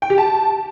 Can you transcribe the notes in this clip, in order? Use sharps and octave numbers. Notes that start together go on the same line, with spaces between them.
G5
G4
A5